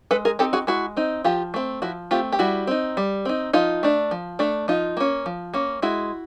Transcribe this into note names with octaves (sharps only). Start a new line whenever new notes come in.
G#3 A4 B4
G#4 A#4
C4 D#4 G4 A4
F#4 G#4
G#3 E4 F#4
C4 D#4
F3 F4 G4
A3 C4
F3 E4 F#4
A3 C4 F4 G4
G4
G3 E4 F#4
C4 D#4
G3
C4 D#4
F3 D#4 F4
A3 D4
F3
A3 D4
F3 D#4 F4
A#3 C#4
F3
A#3 C#4
G#3 E4 F#4